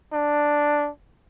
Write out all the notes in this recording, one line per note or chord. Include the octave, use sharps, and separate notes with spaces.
D4